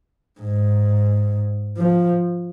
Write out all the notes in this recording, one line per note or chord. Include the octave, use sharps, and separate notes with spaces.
G#2
F3